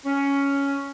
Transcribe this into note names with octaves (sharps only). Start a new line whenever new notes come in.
C#4